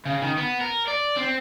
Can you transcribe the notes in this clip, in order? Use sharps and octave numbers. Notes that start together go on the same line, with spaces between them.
C#3
D#3
B3
A#4
D5
C4